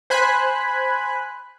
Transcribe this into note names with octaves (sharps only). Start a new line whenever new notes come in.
C5 G#5 B5 F#6